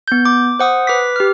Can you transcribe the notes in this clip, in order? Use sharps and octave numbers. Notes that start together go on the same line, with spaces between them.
B3 G6
D6
C5 F#5 D#6
B4 D6 B6
G4 F6